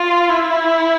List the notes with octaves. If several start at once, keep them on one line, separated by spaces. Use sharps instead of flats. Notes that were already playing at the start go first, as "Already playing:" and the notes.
Already playing: F4
E4